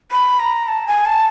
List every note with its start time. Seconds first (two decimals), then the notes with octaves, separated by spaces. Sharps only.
0.11 B5
0.40 A#5
0.68 A5
0.87 G#5
1.06 A5